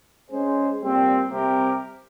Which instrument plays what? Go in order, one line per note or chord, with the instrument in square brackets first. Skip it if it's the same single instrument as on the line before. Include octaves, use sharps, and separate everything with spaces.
[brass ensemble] G#3 C#4 G#4 C5
A#2 G3 C4
C3 G3 C4 G4 A#4